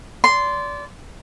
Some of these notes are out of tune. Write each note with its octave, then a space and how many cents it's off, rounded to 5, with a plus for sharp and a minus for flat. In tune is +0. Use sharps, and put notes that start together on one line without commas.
D5 -25 C6 -10